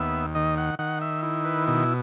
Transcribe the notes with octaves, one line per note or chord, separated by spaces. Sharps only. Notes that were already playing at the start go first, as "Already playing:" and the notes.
Already playing: D#2 B3 E5
D#3 D#5
F#5
D#3 F#5
E5
E4
B4
B2